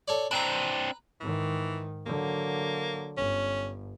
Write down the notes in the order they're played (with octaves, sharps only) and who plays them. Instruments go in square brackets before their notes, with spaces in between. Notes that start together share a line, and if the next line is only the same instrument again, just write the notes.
[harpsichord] A4 C#5 D5
[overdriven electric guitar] C4 D4 [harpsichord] B4 A#5
[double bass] G#2 D#3 [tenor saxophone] E3
[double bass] D3 F#3 [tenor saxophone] A#3
[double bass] G1 [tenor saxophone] C#4